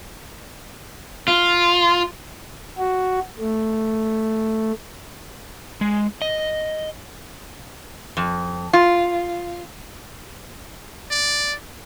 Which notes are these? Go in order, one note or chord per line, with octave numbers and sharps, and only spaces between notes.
F4
F#4
A3
G#3
D#5
F2
F4
D5